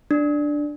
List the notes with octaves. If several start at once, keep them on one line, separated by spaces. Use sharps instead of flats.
D4